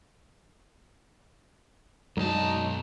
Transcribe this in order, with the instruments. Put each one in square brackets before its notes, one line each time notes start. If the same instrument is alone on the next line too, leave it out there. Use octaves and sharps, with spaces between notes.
[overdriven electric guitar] B1 A5 [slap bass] F#2 G#3 [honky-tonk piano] F#3 [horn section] D4 D#4